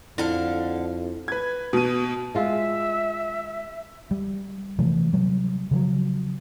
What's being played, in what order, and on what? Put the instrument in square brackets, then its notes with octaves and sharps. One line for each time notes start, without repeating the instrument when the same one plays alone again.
[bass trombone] F2 [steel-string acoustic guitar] D3 A4 F5 [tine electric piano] E4
[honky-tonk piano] B4 G#6
B2 D#7
[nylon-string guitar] G#3 F4 [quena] E5
[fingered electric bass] G3
C3 E3 F3 A3
C3 F#3 G3
C#3 F3 F#3